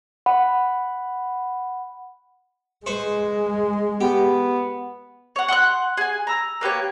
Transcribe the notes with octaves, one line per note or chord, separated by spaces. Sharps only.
F#5 B5
G#3 B4 C5 C#6
B3 G4
C#5 F#5
F#5 C6 E6 F#6
G#4 G#5
A#5 E6
A#3 B3 G4 C#5